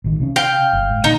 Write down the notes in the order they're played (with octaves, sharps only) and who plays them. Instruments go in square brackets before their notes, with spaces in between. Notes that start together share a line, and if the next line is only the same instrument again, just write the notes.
[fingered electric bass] A1 D#3
C3 C4 C#4
[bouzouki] F5 G5
[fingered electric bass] G1
G#2
[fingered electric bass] A#2 D3 [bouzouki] D#4